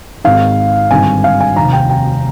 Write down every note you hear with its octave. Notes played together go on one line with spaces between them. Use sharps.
G#1 G#2 D#3 F5
G#1 G2 D3 G#5
F5
G#5
F1 D#2 D#3 A#5
G5
G5